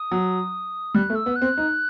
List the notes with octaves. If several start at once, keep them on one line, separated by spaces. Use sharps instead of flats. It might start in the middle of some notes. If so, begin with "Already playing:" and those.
Already playing: D#6
F#3
G3 F#6
A3
E6
B3
F#6
C4
D#4